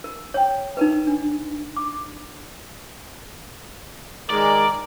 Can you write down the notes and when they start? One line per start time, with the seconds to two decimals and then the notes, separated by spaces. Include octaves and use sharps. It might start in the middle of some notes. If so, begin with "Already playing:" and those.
0.04 A#4
0.34 C#5 G5
0.77 D#4 A#4 B4
1.07 D4
1.77 D6
4.30 D#3 G#3 A#4 D5